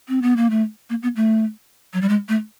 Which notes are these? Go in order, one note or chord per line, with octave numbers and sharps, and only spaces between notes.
C4
B3
A#3
A3
A#3
B3
A3
F#3
G3
G#3
A3